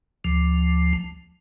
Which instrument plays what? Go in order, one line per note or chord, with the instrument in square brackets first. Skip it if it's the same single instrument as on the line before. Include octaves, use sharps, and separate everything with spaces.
[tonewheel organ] D2 F3